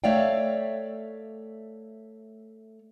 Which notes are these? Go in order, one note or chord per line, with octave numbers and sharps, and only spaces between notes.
A3 C#5 D5 E5 F5 G5